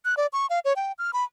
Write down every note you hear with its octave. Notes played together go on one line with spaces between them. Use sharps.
F#6
D5
C#6
F5
C#5
G5
F6
B5